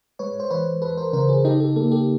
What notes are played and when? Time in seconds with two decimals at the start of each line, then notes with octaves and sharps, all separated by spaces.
0.19 G#3 B4 C#5
0.40 C5
0.50 E3 B4 C#5
0.82 E2 A4 B4
0.97 A#4 C5
1.13 C#3 A#4 C5
1.29 G#4 A#4
1.45 D#4 G4 A4
1.60 G4 A4
1.76 A#3 G4 A4
1.91 G4 A4